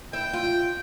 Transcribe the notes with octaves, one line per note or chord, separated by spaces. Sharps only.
E4 G5
F4